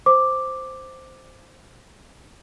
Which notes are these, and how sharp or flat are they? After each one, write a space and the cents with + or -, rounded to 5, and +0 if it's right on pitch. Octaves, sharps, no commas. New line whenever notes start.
C5 +0 D6 +0